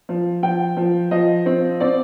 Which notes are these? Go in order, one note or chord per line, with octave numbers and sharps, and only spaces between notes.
F3
F3 G5
F3
F3 D#5
C4
C4 D5